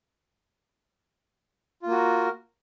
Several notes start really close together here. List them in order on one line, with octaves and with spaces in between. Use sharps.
F4 A#3 F#4 A#4